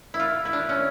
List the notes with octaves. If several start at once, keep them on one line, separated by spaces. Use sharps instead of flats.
E4
F4
E4
D4
C#4